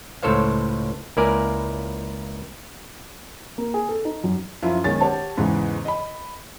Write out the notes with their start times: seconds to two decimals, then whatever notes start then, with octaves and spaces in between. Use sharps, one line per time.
0.23 C#2 A2 A4 C5 C#5 F5
1.17 C#2 A#3 E4 A#4 D5 G#5
3.58 A#3
3.74 G#4
3.89 A4
4.05 D#4
4.24 F#2
4.63 F#2 F3 E4 F4
4.84 B1 D#3 G#3 C#4 A6
5.01 F#4 G4 C#5 A5
5.37 E2 G#2 C#3 E3
5.85 D#5 B5